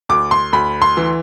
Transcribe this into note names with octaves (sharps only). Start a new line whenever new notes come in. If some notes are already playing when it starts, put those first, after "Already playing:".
D2 D6
C6
D2 B5
C6
E3